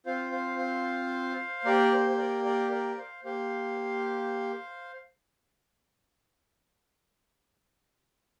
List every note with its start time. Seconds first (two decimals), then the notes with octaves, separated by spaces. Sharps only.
0.06 C4 F4 C5 F5
0.32 C5 F5
0.59 C5 F5
1.65 A#3 G4 A#4 D5
1.92 C5
2.10 C5
2.18 A#4 D5
2.45 A#4 D5
2.71 A#4 D5
2.98 C5 F5
3.24 A#3 G4 C5 F5